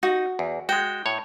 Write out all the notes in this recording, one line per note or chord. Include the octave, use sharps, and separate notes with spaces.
D#4 F#4
E2
G#3 F#4 G5
A2 C#5